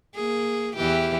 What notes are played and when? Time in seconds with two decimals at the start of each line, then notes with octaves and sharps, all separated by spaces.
0.16 A#3 G#4
0.77 E2 E3 G4